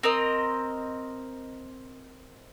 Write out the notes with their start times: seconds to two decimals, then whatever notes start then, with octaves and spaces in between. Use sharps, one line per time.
0.03 C4 A#4 D#5